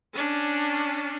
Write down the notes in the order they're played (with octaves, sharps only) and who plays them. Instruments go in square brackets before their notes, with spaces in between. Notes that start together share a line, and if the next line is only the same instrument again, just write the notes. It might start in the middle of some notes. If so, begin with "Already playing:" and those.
[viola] C#4 D4